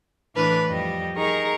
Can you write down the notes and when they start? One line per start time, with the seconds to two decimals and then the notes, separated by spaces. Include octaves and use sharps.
0.35 A2 E3 D4 B4 F6
0.66 F2 G3 D#5
1.16 D#4 G#4 A#4 A#5 C#6